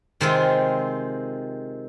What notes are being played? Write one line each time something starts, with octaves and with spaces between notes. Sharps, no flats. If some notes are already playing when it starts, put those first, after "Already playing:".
C3 D#3 G#3 C4 F4